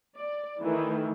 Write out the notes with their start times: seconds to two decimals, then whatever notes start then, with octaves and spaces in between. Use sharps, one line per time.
0.17 D5
0.62 D#3 E3 A3